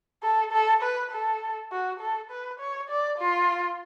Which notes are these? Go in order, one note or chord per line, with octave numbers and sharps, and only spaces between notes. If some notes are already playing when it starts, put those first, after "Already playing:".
A4
A4
B4
A4
F#4
A4
B4
C#5
D5
F4